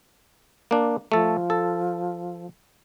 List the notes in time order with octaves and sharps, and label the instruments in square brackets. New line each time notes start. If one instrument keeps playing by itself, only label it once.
[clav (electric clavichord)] A#3 D4
[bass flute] F3 [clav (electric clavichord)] A3 A4
[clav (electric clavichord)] A4